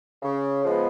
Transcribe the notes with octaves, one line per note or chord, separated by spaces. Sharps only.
C#3
F3 G#3 B3